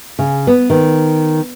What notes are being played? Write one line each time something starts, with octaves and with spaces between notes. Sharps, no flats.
C#3
B3
D#3